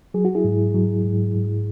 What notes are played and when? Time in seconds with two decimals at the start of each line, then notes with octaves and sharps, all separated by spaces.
0.14 F#3 G#4
0.25 F#4
0.35 E4 G#4
0.44 G#2
0.74 F#3
1.04 G#2
1.35 G#2